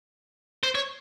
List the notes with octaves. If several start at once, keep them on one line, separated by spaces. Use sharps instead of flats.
C5
C#5